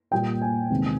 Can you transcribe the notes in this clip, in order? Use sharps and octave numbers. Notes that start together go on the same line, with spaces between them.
A#2 G3 A#3 G5
G#5
E2 C3 D#3 G#3